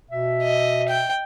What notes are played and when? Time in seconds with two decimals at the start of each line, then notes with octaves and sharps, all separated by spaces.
0.11 B2 E5
0.43 D#5
0.89 G5